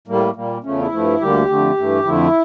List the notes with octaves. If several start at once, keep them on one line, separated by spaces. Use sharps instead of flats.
A2 G3 A#3
A#2 G3 A#3
E2 C#3 F3 A3 C#4
E4
G2 F3 A3
D2 D3 G3 A#3 G4
F2 D3 A3
G2 E3 A3
F2 D3 F3 A3 E4